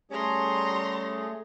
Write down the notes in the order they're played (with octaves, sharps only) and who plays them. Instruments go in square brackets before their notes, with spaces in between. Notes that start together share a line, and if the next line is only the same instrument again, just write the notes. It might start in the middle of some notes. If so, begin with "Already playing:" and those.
[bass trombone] G3 [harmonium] A3 G#4 [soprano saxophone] C#4 [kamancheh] A#5 C6